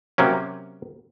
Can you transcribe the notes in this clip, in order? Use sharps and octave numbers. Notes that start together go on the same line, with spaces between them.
C3 F#3 A#3 C#4